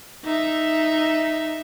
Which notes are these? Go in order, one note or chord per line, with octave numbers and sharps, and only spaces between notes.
D#4 E5